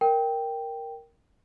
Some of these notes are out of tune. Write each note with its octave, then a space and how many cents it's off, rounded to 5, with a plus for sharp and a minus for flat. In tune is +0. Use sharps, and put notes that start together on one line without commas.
A#4 +0 G5 +0